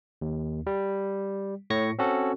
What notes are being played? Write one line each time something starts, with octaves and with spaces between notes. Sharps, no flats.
D#2
G3
A2 C#5 C#6 A#6 C#7
C4 C#4 F#4 A4